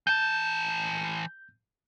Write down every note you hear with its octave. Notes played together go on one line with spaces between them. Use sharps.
E3 A5 G6